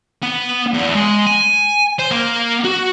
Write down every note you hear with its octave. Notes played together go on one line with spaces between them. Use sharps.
B3
E2
G#3
G#5
C5
A#3
F#4